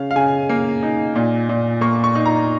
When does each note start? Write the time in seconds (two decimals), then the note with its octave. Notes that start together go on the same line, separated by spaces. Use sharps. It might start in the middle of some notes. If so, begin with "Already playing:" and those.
Already playing: C#3 F5
0.11 F5
0.16 C#3 G#5
0.49 A#3
0.83 D#4
1.15 A#2
1.49 A#2
1.81 A#3 C#6
2.04 C#6
2.15 D#4
2.26 A#5